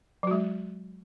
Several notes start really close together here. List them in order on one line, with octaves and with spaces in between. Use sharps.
F#3 F#4 G#3